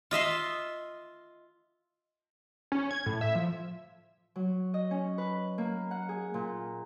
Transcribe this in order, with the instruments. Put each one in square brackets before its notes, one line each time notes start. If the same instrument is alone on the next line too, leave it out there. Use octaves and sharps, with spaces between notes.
[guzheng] F4 D#5 E5 C6
[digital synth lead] C#4
G#6
A2
E5
F3
[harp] F#3
D#5
C#4
B4
A#3
F#5
G#4
A#2